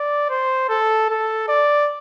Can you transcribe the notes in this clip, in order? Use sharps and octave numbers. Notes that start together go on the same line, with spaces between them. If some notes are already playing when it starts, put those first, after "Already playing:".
Already playing: D5
C5
A4
A4
D5